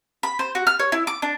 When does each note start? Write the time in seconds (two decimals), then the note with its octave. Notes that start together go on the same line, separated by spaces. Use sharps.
0.23 B5
0.39 C5
0.55 F#4
0.67 F6
0.79 C#5
0.92 E4
1.07 D6
1.22 D4